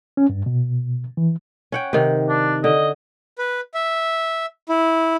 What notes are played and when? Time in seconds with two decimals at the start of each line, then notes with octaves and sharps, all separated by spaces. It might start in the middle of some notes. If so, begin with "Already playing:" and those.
0.17 C#4
0.29 G2
0.46 B2
1.17 E3
1.72 C#4 F#5 G5
1.93 C3 D#3
2.29 D4
2.64 D3 D#5
3.38 B4
3.74 E5
4.69 E4